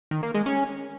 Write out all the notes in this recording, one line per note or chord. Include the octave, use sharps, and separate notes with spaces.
D#3
A#3
G#3
C#4